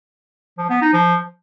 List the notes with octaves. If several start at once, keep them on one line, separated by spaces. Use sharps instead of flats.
F3
B3
D#4
F3